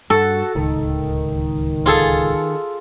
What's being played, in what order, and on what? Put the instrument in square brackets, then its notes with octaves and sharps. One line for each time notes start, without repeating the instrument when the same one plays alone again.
[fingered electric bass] G2 [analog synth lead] F#4 [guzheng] A4
[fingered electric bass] D1 C#2 [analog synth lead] D#3
[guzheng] F4 G#4 A4